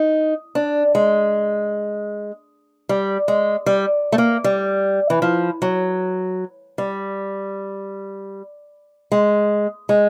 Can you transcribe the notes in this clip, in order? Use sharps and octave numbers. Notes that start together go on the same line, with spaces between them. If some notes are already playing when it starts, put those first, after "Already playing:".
Already playing: D#4
D4
G#3
G3
G#3
G3
A3
A#3
G3
E3
F3
F#3
G3
G#3
G#3